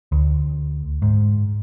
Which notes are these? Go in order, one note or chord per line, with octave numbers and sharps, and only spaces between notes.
D2
G#2